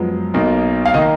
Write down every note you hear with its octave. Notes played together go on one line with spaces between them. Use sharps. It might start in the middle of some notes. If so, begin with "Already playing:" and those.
Already playing: F#2 F3 G#3 B3
B1 B2 A#3 D#4
F5
D#3 A#3 D#4 D#5